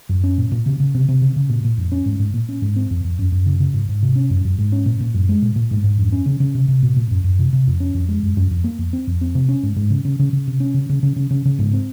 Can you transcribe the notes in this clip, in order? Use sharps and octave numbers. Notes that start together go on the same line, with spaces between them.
F#2
C#4
A#2
A#2
C#3
C#3
C3
C3
C#3
C#3
A#2
A#2
F2
C#4
G#2
G#2
A#2
C#4
G#2
C4
F2
F2
F#2
F#2
C#3
C#3
G#2
G#2
C3
C#4
F#2
F#2
G#2
C#4
A#2
A#2
F#2
G#3
A#2
A#2
G#2
G#2
F2
C#4
C#3
C#3
C3
C3
A#2
A#2
F#2
F#2
C3
C3
F2
C#4
F2
G#3
F#2
F#2
F2
A#3
F2
C4
F2
C4
C3
C#4
G#2
G#2
C#3
C#3
C#3
C#3
C3
C#4
C#3
C#3
C#3
C#3
C#3
C#3
G#2
C4